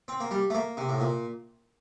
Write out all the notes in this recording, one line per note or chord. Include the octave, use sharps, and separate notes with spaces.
C4
A#3
G3
A3
A#3
C3
A2
A#2